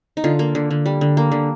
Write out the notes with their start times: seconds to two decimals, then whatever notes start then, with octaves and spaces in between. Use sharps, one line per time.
0.17 D#4
0.24 D3 F4
0.39 A#3
0.55 D3
0.71 D3
0.86 G3
1.01 D3
1.17 A#3
1.32 D3